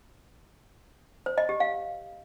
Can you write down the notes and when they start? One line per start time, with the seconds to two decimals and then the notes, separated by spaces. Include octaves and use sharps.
1.26 C5
1.38 D#5
1.49 G4
1.60 F5